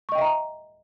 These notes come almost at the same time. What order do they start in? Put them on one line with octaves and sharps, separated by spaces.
C#6 D#5 G5 E5 A#5